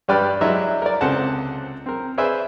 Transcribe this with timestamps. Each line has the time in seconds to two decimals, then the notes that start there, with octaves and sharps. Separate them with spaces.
0.08 G2 G3 G4 B4 D5 F6
0.41 F#3 G#3 D4 E4 D#5 E5
0.82 A#4 D5
1.01 C#2 C3 A4 C5 F#5 A5
1.86 C4 A#4
2.18 G#4 B4 C5 D5 E5 G#5